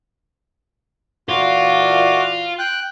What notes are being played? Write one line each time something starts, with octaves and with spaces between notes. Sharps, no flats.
A#2 E3 F4 F#4 D6
G5 F#6